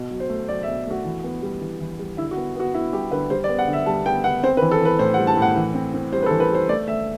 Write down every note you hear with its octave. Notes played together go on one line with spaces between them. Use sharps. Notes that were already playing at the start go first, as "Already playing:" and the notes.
Already playing: B2
F#3
C5
A3
F#3 D5
E5
B2
A3 F#4
E3
B3
G3
E3
E3
G3
D3 E4
F#4
B3
B3 F#4
B3 E4
G3 G4
D3 B4
G3 C5
D5
B3
F#5
D3
E5
G3 A5
B3 G5
B3 F#5
C4 C5
B4
E3
A4
E3 B4
A2 C5
F#5
G3
A5
A2
F#5
E3
C4
C4
G3 C5
B4
A4
E3
B4
G3 C5
A3 D5
A3 E5